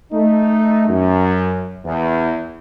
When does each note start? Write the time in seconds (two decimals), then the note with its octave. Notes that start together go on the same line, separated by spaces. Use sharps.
0.12 A3 D#4
0.89 F#2
1.85 E2